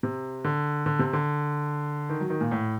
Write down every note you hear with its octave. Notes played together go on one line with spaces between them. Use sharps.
C3
D3
D3
C3
D3
D#3
F#3
D#3
A#2
A2